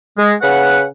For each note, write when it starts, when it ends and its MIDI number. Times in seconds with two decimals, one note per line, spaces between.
0.18 0.34 56
0.42 0.84 49
0.42 0.84 71
0.42 0.84 78